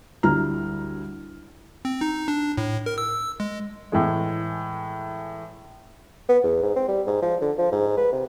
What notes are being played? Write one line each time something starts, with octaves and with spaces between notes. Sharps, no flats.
D2 G3 E4 A#5 F6
C4
D#4
D4
A2
A#4
E6
G#3
A2 E3 G#3
B3
E2
G#2
C4
G3
G#2
F3
D3
F3
G#2
B4
C3